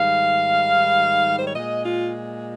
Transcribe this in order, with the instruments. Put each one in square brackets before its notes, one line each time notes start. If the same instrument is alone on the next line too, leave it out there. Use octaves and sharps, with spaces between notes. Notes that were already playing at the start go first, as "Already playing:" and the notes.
Already playing: [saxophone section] G#2 D#3 G3 F5
C5
C#5
A#2 G#3 D#5
F4